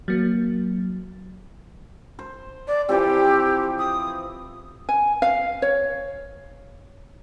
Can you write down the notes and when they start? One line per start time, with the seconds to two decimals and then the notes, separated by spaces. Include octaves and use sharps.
0.08 F#3 A#3
2.19 C5
2.67 D5
2.89 E3 F3 C4 G4
3.79 D#6
4.89 G#5
5.22 F5
5.62 C#5